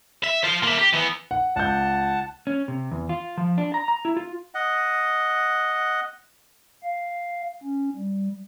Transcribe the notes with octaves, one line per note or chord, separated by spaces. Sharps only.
E5
F4 C5
A#3 E5
G4
E3 B3
F#5
C#2 F#5 A5 G6
C#4
C3
E2
F4
F3
D4
A#5
A#5
E4
F4
D#5 F#5
F5
C#4
G3